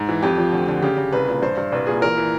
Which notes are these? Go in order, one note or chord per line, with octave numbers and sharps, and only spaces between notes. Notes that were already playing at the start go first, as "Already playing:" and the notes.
Already playing: G#2
E3
F2 G4
F3
D2
D3
C#3 G4
C#3
C2 B4
A#2
G2 C5
G2
C2 B4
A#2 G#4
E3 A#4
E3